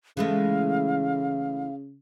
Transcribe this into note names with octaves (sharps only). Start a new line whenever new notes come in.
C#3 E3 G#3 A3 F5